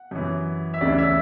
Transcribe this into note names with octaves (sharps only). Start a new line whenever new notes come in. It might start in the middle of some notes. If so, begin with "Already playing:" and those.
Already playing: F#5
F#2 E3
E5
D2 C#3 E3 D5
E5